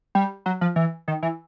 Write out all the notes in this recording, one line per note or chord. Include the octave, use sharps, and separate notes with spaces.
G3
F#3
F3
E3
D#3
E3